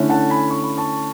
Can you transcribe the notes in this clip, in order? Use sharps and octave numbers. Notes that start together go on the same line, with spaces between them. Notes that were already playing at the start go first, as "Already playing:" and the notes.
Already playing: D3 A3 C#4 E4
F#5 A5
G#5 B5
C#6
B5
A5 C#6